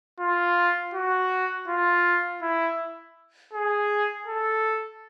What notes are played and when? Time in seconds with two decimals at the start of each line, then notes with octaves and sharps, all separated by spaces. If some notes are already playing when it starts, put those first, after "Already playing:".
0.20 F4
0.94 F#4
1.68 F4
2.42 E4
3.53 G#4
4.27 A4